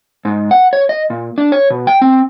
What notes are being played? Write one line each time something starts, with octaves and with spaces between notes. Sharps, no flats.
G#2
F#5
C#5
D#5
A#2
D4
C#5
B2
G5
C4